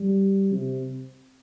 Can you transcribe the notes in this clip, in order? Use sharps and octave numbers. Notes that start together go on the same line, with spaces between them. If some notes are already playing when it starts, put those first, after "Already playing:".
Already playing: G3
C3